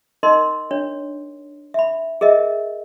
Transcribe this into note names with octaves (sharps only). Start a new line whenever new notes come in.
D#4 A#4 D#5 C6
D4 C#5
E5 B5
G#4 A#4 D#5 E5